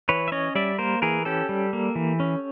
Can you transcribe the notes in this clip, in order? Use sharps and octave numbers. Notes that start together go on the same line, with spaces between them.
E3 B4 C#5
E5
C#4 C#5 D#5
G3 D5 E5
A#3 A#4 C5
E3 G#4 A#4
C#4 G4 A4
G3
A#3
E3
C#4